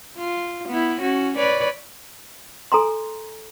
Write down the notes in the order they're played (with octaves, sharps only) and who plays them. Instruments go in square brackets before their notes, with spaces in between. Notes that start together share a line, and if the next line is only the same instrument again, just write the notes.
[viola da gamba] F4
B3 E4
C#4 F#4
B4 C#5 D5
[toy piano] A4 G#5 A#5 C6